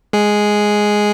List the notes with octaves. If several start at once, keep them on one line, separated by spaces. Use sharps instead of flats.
G#3 G#4